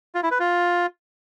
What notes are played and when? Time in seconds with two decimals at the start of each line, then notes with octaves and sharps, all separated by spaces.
0.15 F4
0.23 E4
0.31 B4
0.40 F4